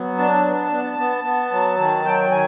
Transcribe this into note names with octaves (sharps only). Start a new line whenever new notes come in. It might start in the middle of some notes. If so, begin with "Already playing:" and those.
Already playing: F#3 B3
D4 A5
B3
B3
B3
B3
F#3
D#3
F#3 G5
D#3 G#5